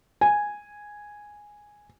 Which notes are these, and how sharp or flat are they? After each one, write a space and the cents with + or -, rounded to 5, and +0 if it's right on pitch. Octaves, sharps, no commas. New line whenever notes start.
G#5 -5